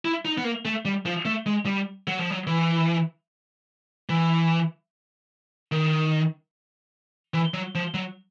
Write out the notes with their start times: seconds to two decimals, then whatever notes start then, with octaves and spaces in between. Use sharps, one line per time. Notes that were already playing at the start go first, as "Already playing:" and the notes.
0.05 E4
0.25 D#4
0.38 B3
0.44 A#3
0.65 A3
0.85 G3
1.06 F3
1.25 A3
1.46 G#3
1.66 G3
2.07 F#3
2.19 F3
2.31 F#3
2.47 E3
4.09 E3
5.72 D#3
7.34 E3
7.54 F#3
7.75 F3
7.94 F#3